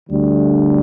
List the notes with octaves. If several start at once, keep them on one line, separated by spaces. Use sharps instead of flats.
D2 D3 G3 D4